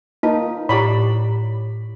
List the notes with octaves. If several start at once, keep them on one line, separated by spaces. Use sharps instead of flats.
A#3 D#4 F4 B4 A5
A2 G4 D5 A#5 B5 C#6